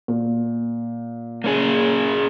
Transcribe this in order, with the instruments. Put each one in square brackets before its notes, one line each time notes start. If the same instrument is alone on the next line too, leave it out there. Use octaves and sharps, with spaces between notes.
[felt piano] A#2
[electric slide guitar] A#3 C#4 G#4